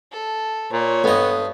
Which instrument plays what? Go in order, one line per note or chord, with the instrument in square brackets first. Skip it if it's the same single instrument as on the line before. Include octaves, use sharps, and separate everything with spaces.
[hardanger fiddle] A4
[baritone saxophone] A#2 [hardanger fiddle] C#5
[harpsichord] G2 D#5 [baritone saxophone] B3 [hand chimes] A4